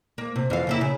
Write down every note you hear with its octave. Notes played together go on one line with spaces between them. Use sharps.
A#3
C3
F2 E3 F5
C#3 A#3 E4
C#3